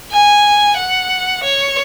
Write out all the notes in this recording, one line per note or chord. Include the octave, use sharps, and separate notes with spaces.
G#5
F#5
C#5